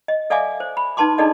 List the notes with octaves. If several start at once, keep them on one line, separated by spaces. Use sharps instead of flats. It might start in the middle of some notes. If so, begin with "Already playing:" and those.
D#5
A4 D5 E5 F5 G#5 D6
C5
B5
D#4 B4 A5 C6 D6
D4 D#4 G#4 A4 D5 D#5